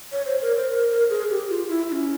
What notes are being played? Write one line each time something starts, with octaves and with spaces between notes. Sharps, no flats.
C#5
C5
A#4
C5
A#4
A#4
G#4
G4
F4
E4
E4
C#4